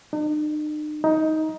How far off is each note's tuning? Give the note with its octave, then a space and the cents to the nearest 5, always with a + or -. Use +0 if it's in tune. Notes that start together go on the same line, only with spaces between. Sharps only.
D#4 -45
D#4 +15